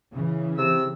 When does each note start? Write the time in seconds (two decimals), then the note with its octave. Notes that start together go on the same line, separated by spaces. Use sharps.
0.13 C#3 E3
0.57 C3 C4 E6